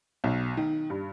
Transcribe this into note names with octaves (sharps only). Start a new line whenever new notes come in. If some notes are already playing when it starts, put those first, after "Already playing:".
B1
D#3
G2